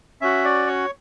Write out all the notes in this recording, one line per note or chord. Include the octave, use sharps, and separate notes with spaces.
C#4 F#4 E5
D5
C#5